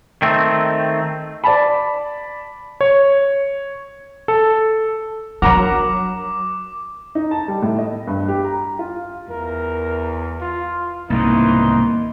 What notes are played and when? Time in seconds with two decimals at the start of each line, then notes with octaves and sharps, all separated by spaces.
0.22 D#3 A3 C4
1.44 D5 A5 B5
2.81 C#5
4.28 A4
5.42 F#3 D4 A#4 F#5 A#5 D6
7.15 D#4
7.31 A5
7.48 G3
7.62 A2
7.79 D#5
8.07 G2
8.28 G4
8.45 A#5
8.79 F4
9.30 E2 A#4
10.41 F4
11.10 C2 G#2 B2 D#3 E3 A#3 D#4 C6